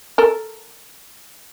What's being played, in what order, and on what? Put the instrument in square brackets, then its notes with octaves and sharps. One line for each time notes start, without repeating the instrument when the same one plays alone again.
[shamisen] A4 A#4